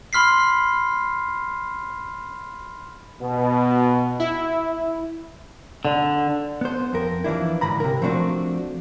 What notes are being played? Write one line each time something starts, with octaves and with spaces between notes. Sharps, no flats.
B5 C6 F6 B6 C7
B2
E4
D3
B3 C5
F2 A#4
E3 F3 D4 E4
G#2 D3 A#5 B5
C3 A#4
F3 A3 C4 D4 F#4